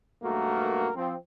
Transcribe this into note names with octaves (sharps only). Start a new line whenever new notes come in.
B1 G2 A3 A#3 F#4 A#4
F3 C4